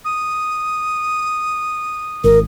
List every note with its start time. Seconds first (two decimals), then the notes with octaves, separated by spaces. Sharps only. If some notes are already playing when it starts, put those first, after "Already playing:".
0.05 D#6
2.24 G#1 G#2 A#4